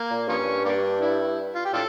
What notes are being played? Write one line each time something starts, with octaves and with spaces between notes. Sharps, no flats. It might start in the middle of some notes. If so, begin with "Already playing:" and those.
Already playing: A#3
A#2
G2 F3 A#3 C#4
G3 A#3 D4
E4
F4
G4
A2 D4 F4 A4